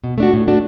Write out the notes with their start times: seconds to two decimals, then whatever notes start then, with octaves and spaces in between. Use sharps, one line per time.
0.04 B2
0.18 A3 D4 F#4
0.33 A2
0.48 A3 D4 F#4